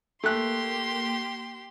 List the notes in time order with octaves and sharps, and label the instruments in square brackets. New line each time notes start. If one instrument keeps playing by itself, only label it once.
[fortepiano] A3 F#6 [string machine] A#3 [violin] G4 [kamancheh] C6